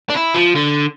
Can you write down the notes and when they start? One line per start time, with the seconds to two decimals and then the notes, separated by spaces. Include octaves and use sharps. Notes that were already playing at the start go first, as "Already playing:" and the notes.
0.10 D4
0.15 E4
0.34 F3
0.56 D3